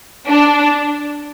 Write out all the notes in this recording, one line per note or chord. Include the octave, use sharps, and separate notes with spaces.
D4